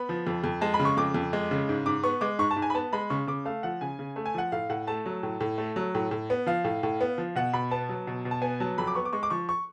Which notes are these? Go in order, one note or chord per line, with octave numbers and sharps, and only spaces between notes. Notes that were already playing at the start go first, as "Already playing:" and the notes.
Already playing: B3 B5
F3
F2
F2
G#3 A5
B5
C#3
C#6
F2 D6
F2
G#3
C#3
G#2
G#2 D6
B3 C#6
G#3 D6
G#2 C#6
A5
G#2
G#5
B5
B3 A5
G#3 B5
C#3 C#6
C#3 D6
A3 F5
F3 F#5
C#3 G#5
C#3
A3
G#5
F3 F#5
A2 F5
A2 F#5
A3 A5
F#3
A2
A2
A3
F#3
A2
A2
B3
F3 F5
A2
A2
B3
F3
B2 F#5
B2 B5
B3 A5
F#3
B2
B2
A5
B3 G#5
F#3 A5
F2 B5
D6
B3 C#6
D6
G#3 C#6
D6
F3 C#6
C#6